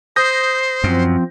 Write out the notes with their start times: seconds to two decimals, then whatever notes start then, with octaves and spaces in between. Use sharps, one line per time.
0.16 C5 D#6 G6 A#6
0.84 F#2 F3 C4